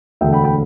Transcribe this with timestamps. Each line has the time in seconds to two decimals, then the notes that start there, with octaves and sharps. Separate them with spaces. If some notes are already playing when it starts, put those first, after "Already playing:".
0.21 E1 D2 D3 E5 G5
0.32 G5 B5
0.44 G5 B5